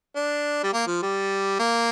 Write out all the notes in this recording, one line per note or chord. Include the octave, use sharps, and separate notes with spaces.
D4
G3
A#3
F3
G3
A#3